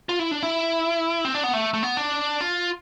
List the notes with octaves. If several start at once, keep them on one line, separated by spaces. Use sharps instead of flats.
F4
E4
D4
E4
C4
D4
B3
A3
A3
B3
D4
F4